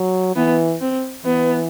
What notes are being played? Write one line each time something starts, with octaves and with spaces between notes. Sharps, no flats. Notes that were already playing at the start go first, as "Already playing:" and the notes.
Already playing: F#3
E3 B3
C4
E3 B3